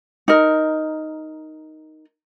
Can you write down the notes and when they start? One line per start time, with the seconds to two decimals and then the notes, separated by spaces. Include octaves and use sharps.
0.28 D#4 A#4